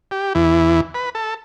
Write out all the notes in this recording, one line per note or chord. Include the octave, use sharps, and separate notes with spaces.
G4
E2 E3
B4
A4